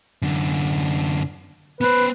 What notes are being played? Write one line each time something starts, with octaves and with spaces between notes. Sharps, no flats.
F#2 D3
B3 B4 C5